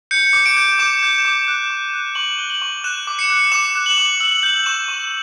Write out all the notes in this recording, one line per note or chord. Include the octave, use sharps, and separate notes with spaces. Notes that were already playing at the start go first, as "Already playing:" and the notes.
G6 C#7
D6
D7
G6
D6 E7
G6
D6
F#6
C#6
F#6
C#6 F#7
F#6 G7
F#7
C#6
F#6 E7
D6
C#7
F#6
D6 E7
F#6
F#7
D6
E6 F#7
G6 F#7
C#6 E7
C#6 E7